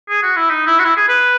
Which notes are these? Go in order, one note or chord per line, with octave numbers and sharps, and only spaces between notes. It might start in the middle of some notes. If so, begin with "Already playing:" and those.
G#4
F#4
E4
D#4
E4
F#4
E4
G#4
B4